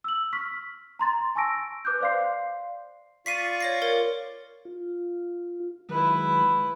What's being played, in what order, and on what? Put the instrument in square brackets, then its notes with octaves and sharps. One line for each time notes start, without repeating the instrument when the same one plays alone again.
[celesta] E6 F#7
C#6 F6 B6
A#5 C6 A6
G#5 A5 C#6 E6 A#6 D7
B4 D6 F#6 G6
C5 D5 F5 C6 C7
[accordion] F4 D5 C#6 [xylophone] B6 C7 D#7
[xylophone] C#5 A#6 C7
A#4 C#5
[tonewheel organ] F4
[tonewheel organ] D#3 F#3 G#3 [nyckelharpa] E4 B4